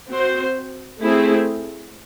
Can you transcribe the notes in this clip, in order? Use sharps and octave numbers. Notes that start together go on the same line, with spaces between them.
C4 F#4 C5
A3 C4 E4 G#4